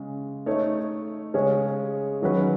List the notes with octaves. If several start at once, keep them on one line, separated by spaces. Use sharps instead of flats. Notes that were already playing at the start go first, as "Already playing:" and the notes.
Already playing: C#3 G#3
A3 D#4 A4 C#5
C#3 G#3 C#4 G#4 C#5
D#3 F#3 C#4 F#4 B4